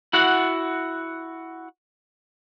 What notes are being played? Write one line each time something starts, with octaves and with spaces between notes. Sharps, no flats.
E4 F#4 F#5